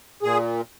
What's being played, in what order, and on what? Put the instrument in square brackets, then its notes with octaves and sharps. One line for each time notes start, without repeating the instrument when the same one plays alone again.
[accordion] A#2 G#4